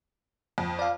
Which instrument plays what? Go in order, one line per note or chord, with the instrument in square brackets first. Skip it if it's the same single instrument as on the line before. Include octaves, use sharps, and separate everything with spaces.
[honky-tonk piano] F2
[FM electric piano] D5 F5